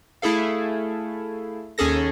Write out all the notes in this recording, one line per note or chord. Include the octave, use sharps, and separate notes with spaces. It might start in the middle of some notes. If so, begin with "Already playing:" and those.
A3 E4 G#4 A4 F5
D#2 C#4 G#4 A4 A#6